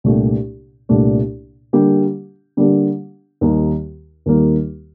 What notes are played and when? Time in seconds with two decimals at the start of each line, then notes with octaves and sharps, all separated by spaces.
0.04 C2 A#2 A3 D4 G4
0.89 C2 A#2 A3 D4 G4
1.73 D3 G3 A#3 D4 G4
2.57 D3 G3 A#3 D4 G4
3.41 D#2 D#3 G3 A#3 D#4
4.26 D#2 D#3 G3 A#3 D#4